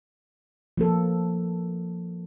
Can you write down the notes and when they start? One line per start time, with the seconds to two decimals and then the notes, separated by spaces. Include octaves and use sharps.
0.77 F3 A#3 A4